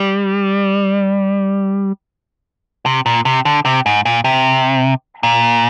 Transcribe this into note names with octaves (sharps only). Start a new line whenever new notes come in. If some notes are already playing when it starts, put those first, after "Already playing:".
Already playing: G3
C3
A#2
C3
D3
C3
G#2
A#2
C3
A#2